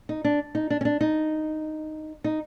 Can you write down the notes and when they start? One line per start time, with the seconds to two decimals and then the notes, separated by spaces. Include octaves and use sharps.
0.09 D#4
0.24 D4
0.55 D#4
0.70 D4
0.81 C#4
0.85 D4
1.01 D#4
2.24 D#4